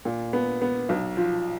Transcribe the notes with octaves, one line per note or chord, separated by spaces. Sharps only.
A#2
B3
B3
B1
F3